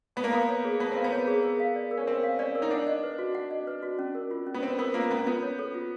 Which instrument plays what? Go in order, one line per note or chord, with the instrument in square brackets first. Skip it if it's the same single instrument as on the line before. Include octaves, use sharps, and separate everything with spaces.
[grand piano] B3 [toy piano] A5
[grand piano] A#3
[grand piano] B3 [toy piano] F5
[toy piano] C#5
G#4
[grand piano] B3 [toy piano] A5
[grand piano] C4 [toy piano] F5
[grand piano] B3
[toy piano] C#5
G#4
A#4
F5
D5
A#4
[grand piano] C#4
[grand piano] C4 [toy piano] A#4
[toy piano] F5
[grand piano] C#4 [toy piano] D5
[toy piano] A#4
[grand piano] D#4
[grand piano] D4 [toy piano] F#5
[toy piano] D#5
B4
F#4
F#5
D#5
B4
F#4
C#4
A#4
F4
C#4
[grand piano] B3
[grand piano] C4 [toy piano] C#4
[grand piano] B3 [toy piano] A#4
[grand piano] A#3 [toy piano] F4
[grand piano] B3 [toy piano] C#4
[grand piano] B3 [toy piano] F4
[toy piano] C#5
A4
F4